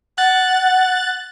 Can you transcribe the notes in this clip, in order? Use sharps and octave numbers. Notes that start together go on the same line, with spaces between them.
F#5 F#6 A6